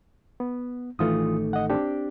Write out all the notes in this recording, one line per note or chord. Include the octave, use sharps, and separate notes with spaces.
B3
A1 D#3 E3 A3 F4 D#6
D#5 F#5
C4 D4 G4